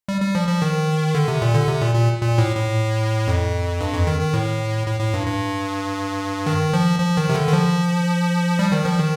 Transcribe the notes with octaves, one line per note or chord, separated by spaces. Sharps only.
G3
G3
F3
F3
D#3
D3
C3
A#2
D3
C3
A#2
A#2
A#2
A2
A2
F2
G2
F2
D#3
D#3
A2
A2
A2
G2
G2
D#3
F3
F3
D#3
C3
D3
D#3
F3
G3
D#3
F3
D#3